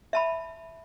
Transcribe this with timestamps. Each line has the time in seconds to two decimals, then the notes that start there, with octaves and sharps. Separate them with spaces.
0.13 E5 A5 B5